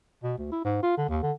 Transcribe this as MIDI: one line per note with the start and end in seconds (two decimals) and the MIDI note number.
0.23 0.34 47
0.38 0.51 38
0.52 0.61 64
0.65 0.83 44
0.83 0.97 65
0.97 1.06 50
1.09 1.19 39
1.23 1.32 50